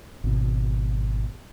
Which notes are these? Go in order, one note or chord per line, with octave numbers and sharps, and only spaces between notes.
G#1 B2